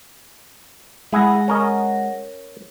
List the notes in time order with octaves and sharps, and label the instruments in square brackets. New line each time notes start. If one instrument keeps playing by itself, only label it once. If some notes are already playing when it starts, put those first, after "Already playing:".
[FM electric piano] G#3 F#5 A#6 [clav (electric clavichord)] E4 G#4
[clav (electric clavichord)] C#4 A#4 D#5